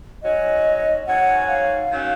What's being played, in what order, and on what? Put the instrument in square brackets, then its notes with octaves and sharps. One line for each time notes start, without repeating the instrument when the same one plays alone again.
[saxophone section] G#2 F#3 C#4 F#4 C#5 [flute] D#5
[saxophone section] G#2 F#3 C#4 F#4 C#5 [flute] F#5
[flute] F5
[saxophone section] D#3 F#3 C#4